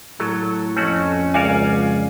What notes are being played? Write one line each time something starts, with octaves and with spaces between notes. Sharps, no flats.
A2 F#3 A4
F2 A3 C#4 F#4
C#2 F#4 A#4 D5 F5 G#5